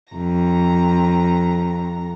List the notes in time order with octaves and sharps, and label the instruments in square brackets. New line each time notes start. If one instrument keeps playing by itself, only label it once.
[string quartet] F2 A#5